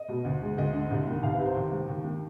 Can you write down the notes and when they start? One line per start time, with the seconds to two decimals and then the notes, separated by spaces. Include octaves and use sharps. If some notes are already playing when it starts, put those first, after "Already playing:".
Already playing: D#5
0.08 B2
0.24 D2
0.41 G#3
0.57 D2 D#5
0.74 D3
0.91 C2
1.06 D#3
1.23 C2 F5
1.34 B4
1.39 C3
1.45 C5
1.55 D#2
1.72 G3
1.88 D#2
2.04 D#3